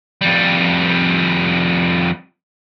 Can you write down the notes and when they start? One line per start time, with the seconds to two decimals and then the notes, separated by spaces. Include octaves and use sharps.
0.21 F2 G3